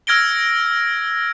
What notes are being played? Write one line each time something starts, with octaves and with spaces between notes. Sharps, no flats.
E6 F6 G#6 A#6 D7 G7